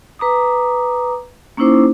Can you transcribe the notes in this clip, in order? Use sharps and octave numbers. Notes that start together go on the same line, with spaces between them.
B4 A#5 D6 D#6
A#3 C#4 D#4 E4 C5 D6